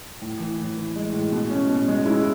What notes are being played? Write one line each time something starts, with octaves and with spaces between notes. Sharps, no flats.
A2
E3
A2
E3
G#3
A2
B2
C#4
B2
G#3
E4